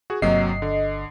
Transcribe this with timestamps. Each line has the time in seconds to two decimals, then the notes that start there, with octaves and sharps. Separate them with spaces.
0.10 F#4 G#4
0.22 G1 C3 F#3 A#3 D#5 C7
0.62 D3